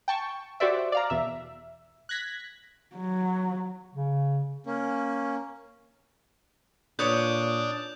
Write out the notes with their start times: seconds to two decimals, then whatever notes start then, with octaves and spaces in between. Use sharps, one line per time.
0.08 G5 A5 C#6
0.60 F#4 G4 C5 D5 E5
0.92 D5 F5 A#5
1.10 E2 B2 E5
2.09 F#6 G#6 A#6 B6
2.96 F#3
3.95 C#3
4.66 A#3 C#4
6.99 A#2 D4 B4 C#5 D#6 G6